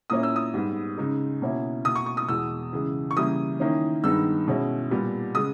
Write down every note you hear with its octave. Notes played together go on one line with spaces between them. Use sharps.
A#2 A#3 C#4 E4 D#6
E6
D#6
G#2 G3 B3
C#3 G#3 D#4
B2 A#3 C#4 E4
B2 A#3 E4 D#6
C#6
C#6
D#6
E2 B2 G#3 E6
C#3 E3 G#3
C#6
C#3 E3 G3 A#3 E4 D#6
D#3 A#3 C#4 E4
G2 D#3 G#3 B3 D#4 E6
B2 G#3 C#4 E4
A#2 G3 B3
C#3 G#3 D#6